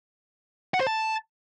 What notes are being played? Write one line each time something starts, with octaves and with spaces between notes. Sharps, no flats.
F#5
C5
A5